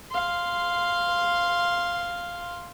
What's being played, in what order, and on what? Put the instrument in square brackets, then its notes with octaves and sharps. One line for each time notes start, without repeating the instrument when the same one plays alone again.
[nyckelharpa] F5 C6